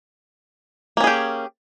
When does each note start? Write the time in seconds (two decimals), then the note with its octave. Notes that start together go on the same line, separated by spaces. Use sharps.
0.97 A#3
1.00 C#4
1.04 G#4
1.07 G4